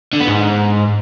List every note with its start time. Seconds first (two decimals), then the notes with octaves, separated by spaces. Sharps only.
0.13 D3
0.20 B3
0.27 G#2